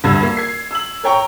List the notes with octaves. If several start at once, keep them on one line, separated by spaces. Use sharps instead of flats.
D2 G2 G3 E6 G#6
A#3
G#6 C7
E6 F#7
A#4 C#5 G5 A#5 C#6